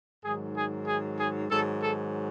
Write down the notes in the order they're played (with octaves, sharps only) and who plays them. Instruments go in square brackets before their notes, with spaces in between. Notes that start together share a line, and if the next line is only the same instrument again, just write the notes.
[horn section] G#2 D#3 F#3 G#4
G#4
G#4
G#4
G#2 D#3 F#3 A4
A4